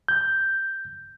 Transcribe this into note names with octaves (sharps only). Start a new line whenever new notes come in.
G6